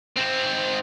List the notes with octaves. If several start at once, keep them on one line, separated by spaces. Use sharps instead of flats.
G#2 C4